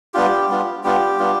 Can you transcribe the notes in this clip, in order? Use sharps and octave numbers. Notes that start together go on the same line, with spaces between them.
G3 B3 D4 F4 G4
G3 B3 D4 F4
G3 B3 D4 F4 G4
G3 B3 D4 F4